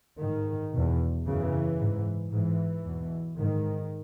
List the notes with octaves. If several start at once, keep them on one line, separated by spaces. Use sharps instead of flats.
G#2 D#3
E2 B2
F#2 C#3 E3
G#2
G#2 E3
E2 B2
G#2 D#3